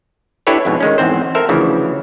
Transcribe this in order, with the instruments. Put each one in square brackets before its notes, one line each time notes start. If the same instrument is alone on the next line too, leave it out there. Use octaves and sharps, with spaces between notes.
[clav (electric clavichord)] D4 E4 G4 A4 B4 C#5
F2 G#2 B2
D#3 G#3 C#4
E2 G#2 C4 C5
A4 A#4 C5 E5
D2 C#3 E3 F3